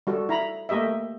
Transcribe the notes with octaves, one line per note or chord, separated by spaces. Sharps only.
G3 F#4 A4
E4 A#5 B5
A3 A#3 G4 D#5 E5